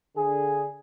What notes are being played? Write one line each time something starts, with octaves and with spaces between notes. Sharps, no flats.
D3 G#4